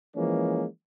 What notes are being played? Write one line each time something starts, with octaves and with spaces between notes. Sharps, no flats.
E3 F3 G#3 A#3 C#4